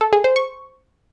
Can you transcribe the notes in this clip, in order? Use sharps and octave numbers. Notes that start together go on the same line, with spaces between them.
A4
G#4
C5
C#6